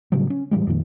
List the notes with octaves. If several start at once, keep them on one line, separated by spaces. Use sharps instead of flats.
A2 C#3 F#3 G3
C#4
A2 E3 G3 G#3
F2 A#2 D#3